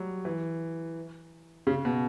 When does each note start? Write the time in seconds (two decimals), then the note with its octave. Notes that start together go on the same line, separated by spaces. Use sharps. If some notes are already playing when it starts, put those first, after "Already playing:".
Already playing: F#3 G3
0.25 E3
1.67 C#3
1.85 B2